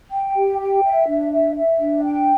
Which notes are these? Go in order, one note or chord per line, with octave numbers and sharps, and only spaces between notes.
G5
G4
G5
E5
D4
E5
E5
D4
G5